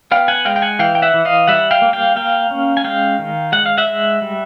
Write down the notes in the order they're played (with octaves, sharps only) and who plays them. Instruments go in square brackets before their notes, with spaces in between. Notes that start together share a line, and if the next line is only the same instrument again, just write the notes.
[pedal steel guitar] B3 F5 G5
F#5 G#5
G#3 F5 G5
G5
F#5 G#5
E3 F5 G5
G5
E5 F#5
E3
D#5 F5
G3 E5 F#5
F5 G5
A#3
F5 G5
A#3 F5 G5
C#4
G#5
G#3 F5 G5
D#3
G#3 F#5
F5
E5 F#5
G#3
G3